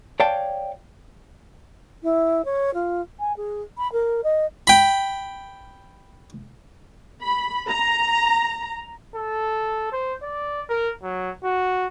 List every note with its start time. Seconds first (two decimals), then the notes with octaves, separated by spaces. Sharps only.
0.20 C#5 D5 F5 G5 A5
2.03 E4
2.45 C#5
2.74 F4
3.19 G#5
3.37 G#4
3.78 B5
3.92 A#4
4.24 D#5
4.67 G5 B5
7.22 B5
7.68 A#5
9.16 A4
9.93 C5
10.22 D5
10.69 A#4
11.03 F#3
11.44 F#4